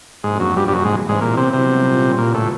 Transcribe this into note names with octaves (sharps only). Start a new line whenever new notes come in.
G#2 C3 F3 A#3 D4 F#4
F#2
G2
G2
F#2 E3 G3 C4 E4
G#2
G#2
A#2 F#3 B3 E4
C3
C3
A#2 G3 A#3 C#4 F4
D#2 A#2 C#3 F#3 B3
A2